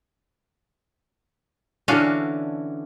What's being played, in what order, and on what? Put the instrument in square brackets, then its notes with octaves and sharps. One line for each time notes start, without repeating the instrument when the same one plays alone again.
[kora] D3 E3 C#4 [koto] D4 F#4 F5